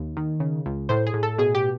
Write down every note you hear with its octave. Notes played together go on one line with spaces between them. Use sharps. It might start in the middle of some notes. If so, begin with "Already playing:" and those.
Already playing: D#2
D#3
C#3
C#2
A2 C5
G#4
A2
A4
B2 G#4
G4